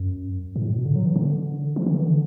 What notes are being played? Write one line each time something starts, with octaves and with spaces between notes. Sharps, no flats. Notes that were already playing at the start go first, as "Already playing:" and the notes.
Already playing: F#2
G#2
A2
B2
D3
F#3
E3
D3
E3
D3
E3
D3